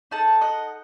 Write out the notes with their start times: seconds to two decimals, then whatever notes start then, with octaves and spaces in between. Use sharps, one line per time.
0.11 D#4 A4 F#5 A5
0.41 D#5 F#5